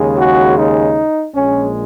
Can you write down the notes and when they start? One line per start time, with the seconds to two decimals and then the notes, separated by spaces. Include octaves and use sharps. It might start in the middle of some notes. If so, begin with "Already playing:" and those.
Already playing: D#2 C#3 G#3
0.18 F#4
0.57 D#4
1.34 A#1 A#2 G#3 C#4